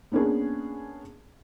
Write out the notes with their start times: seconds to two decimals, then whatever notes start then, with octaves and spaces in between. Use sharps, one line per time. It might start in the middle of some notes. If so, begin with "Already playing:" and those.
0.12 A#3 B3 C#4 D4 G#4